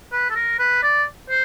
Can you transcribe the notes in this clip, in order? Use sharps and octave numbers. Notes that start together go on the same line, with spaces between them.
B4
A4
A#4
B4
D5
C5